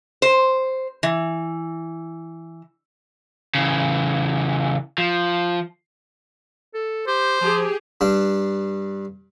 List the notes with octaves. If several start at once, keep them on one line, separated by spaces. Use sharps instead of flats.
C5
E3
C#3 E3
F3
A4
G4 C5
F3 G4 G#4
G2 D4